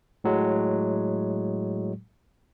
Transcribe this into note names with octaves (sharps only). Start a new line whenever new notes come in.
A2 F#3 G#3